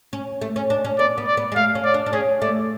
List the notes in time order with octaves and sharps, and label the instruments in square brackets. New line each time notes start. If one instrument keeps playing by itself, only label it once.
[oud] C#4
A3
C#4
D4
C#4
[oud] B3 [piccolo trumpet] D5
[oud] B3
[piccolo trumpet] D5
[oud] B3
G#3
[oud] A3 [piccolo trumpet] F5
[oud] C#4
[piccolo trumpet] D5
[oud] D4
D4
[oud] C#4 [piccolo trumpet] G#4
[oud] A3 [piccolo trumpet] D5